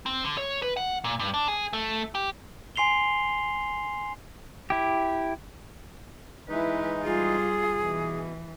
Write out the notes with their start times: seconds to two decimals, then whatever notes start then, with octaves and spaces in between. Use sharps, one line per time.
0.06 C4
0.25 D3
0.37 C#5
0.63 B4
0.77 F#5
1.04 A#2
1.20 G2
1.34 D4
1.48 G#4
1.73 A3
2.15 G4
2.76 G#5 C6 C7 F7 G7
4.70 E4 G4
6.49 E3 G#3 D#4 E4 B4
7.03 G3 F4 G#4
7.83 B2 E3